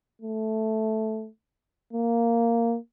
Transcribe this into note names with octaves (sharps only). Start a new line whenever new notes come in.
A3
A#3